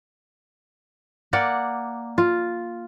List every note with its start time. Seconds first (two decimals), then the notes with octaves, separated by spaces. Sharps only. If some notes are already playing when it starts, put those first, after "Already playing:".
1.33 A#3 D5 F#5
2.18 F4